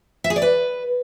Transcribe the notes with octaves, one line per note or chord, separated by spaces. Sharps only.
E5
G#4
D5
B4